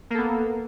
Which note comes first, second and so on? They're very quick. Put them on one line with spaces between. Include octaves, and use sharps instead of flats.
A#3 A4 B3